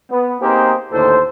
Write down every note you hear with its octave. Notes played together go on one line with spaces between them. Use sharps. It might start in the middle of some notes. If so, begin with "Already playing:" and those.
B3
A#3 C4 D#4 G4 G#4 C5
D#2 A2 D3 A4 C5